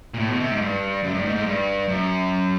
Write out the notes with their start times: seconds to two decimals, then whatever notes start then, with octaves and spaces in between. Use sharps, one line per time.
0.14 A#2
0.19 A2
0.30 B2
0.40 C3
0.51 G#2
0.61 G2
1.04 F#2
1.14 G2
1.25 G#2
1.36 G#2
1.46 G2
1.88 F#2